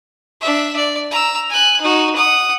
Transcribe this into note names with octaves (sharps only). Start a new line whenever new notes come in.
D4 E5
D5
A#5 E6
G#5 F#6
D#4 F#4
F#5 D#6